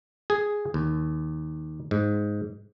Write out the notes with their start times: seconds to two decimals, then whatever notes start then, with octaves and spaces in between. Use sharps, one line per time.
0.30 G#4
0.74 D#2
1.91 G#2